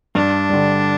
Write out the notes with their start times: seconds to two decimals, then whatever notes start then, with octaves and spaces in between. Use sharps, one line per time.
0.15 G2 D4
0.50 D3 G3